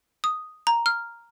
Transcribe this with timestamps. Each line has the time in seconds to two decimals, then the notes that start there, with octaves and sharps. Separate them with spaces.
0.24 D#6
0.67 A#5
0.86 F6